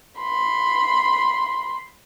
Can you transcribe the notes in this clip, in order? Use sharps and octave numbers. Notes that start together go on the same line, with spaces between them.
B5 C6